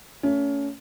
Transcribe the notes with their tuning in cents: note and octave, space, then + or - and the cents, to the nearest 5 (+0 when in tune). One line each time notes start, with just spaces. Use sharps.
A3 +30 C#4 +25